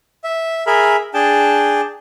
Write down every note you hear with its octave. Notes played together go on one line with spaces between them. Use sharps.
E5
G#4 A#4 E5 B5
D4 G#4 G5 A5